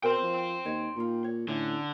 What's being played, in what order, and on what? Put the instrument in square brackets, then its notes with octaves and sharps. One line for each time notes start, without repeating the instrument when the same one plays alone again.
[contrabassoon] B2 [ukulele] A#4 C5 [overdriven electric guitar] G5 C6
[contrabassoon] F3
[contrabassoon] D#2 [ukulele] C#5 D#5
[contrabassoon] A#2 [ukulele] D#4 F4
[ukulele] C#5
[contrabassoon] A2 [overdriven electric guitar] D3 [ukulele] C#4